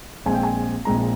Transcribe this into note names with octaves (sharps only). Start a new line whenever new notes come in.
A#1 A#2 G#3 C4 G#5
G5
G#5
A#1 A#2 G#3 C4 A#5